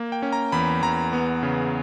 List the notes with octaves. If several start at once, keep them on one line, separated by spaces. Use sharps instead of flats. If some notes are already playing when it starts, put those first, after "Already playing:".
Already playing: A#3
G5
C#4
A#5
E2 B5
E2 A#5
B3
C#3